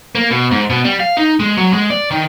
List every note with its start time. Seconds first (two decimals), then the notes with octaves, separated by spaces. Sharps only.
0.15 A#3
0.31 B2
0.51 G#2
0.70 B2
0.84 G3
1.00 F5
1.17 D#4
1.40 G#3
1.57 F#3
1.73 G#3
1.90 D5
2.11 D#3